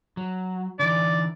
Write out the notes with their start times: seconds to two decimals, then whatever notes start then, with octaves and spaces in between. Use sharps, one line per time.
0.17 F#3
0.79 D3 E3 D5